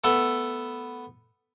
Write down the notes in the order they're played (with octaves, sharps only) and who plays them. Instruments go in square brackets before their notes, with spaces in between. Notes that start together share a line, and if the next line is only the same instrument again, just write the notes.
[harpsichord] A3 B3 A4